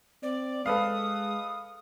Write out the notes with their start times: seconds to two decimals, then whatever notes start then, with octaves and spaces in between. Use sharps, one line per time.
0.23 C4 D5
0.66 G#3 A4 B4 F5 D#6